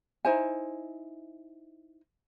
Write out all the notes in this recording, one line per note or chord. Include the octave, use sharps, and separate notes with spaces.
D#4 E4 C5 G#5